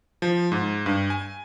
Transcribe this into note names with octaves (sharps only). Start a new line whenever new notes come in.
F3
G#2
G2
G#5